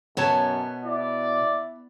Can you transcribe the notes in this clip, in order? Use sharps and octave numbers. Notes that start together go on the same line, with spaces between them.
F#2 B2 B3 C#5 A5
E4 D5